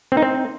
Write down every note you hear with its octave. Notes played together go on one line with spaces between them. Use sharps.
C4
D#4
C4